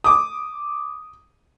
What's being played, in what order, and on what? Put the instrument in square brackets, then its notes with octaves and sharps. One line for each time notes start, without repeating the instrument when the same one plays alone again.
[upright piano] D6 D#6